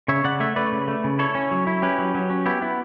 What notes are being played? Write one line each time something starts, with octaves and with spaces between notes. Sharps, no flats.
C#3 C#5 E5
C#3 D5 F#5
A3 C#5 E5
A3 B4 D5
C#3
A3
C#3
E4 A4 C#5
C#4
F#3
E4
C#4 G4 B4
F#3
F#3
C#4
B3 E4 G4
B3 E4